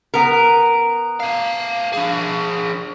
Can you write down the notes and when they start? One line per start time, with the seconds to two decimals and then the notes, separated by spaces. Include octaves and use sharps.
0.14 B3 A#4
1.20 A3 F5
1.93 D4 G#4